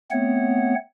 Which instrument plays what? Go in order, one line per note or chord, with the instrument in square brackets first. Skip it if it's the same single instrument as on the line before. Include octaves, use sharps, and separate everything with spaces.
[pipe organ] A3 B3 C4 C#5 F#5